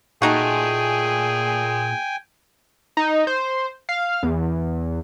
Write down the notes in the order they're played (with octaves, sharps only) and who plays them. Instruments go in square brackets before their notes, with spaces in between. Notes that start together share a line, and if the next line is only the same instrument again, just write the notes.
[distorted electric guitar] A#2 [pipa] A3 D#4 F#4 [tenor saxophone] G#4 [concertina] G5 G#5
[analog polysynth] D#4
C5
F5
E2